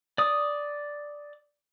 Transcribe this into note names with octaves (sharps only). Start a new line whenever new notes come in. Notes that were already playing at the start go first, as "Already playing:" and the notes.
D5 D#6